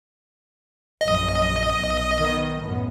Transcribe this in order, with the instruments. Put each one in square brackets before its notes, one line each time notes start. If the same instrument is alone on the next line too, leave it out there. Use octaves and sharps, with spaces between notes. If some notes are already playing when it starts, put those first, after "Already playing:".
[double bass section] A#1 F#2 [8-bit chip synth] D#5
[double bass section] B1
D#3 B3
F#2 A2 B3